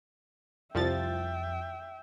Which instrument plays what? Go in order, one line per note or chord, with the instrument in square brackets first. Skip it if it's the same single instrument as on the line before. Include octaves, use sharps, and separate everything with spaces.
[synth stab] C2 F3 A6 [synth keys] F2 [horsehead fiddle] E5 G5